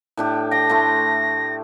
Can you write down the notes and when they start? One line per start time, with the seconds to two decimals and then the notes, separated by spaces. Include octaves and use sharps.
0.17 A2 D4 G4
0.51 G5 A5 A#6
0.69 A3 E4 C6